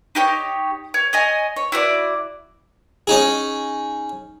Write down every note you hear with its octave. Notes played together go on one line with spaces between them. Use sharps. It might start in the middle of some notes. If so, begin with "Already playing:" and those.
D#4 G4 B4 C#5
C#5
C#5 D#5 G#5
C#5
E4 F#4 C#5 D5
C#4 D#4 G#4